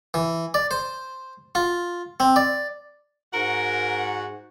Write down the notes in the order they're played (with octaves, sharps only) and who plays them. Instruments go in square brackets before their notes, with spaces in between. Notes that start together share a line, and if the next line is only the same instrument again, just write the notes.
[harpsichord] E3
D5
C5
F4
C4
D5
[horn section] G#2 F#4 F#5 [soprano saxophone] A#4